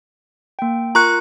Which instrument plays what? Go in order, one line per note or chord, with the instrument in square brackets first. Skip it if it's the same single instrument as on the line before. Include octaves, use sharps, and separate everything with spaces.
[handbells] A#3 G5
[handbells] F4 A#4 C#7 [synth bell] A#5 C#6 F#6